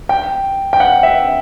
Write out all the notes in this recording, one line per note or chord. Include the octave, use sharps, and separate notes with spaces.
G5
G5
F#5
E5